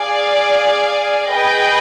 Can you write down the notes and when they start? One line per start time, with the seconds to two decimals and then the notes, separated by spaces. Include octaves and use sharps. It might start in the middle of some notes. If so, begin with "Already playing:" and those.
Already playing: G#4 D5 F5 G#5
1.32 G#4 B4 D#5 G5